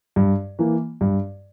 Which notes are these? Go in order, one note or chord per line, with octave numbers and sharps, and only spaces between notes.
G2
E3 A#3
G2